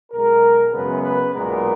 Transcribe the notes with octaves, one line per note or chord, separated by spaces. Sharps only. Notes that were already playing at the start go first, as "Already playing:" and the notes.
B1 B2 G#3 A#4
F#2 C#3 G#3 B3 B4
B4
B1 A#2 G#3 B3 A#4